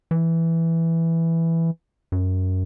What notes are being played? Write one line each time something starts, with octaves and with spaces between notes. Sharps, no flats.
E3
F#2